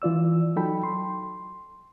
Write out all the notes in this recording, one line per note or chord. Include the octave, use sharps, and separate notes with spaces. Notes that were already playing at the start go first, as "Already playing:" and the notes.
E3 F4 D5 E6
F#3 D#4 A4 G5 B5
C6